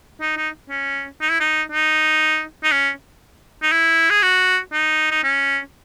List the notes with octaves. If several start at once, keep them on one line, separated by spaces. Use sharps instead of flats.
D#4
D#4
C#4
D#4
E4
D#4
D#4
D#4
C#4
D#4
E4
G#4
F#4
D#4
D#4
C#4